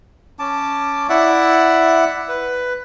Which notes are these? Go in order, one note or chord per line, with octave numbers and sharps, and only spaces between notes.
C#4 A5 D6
E4 D5 E5 F#5
B4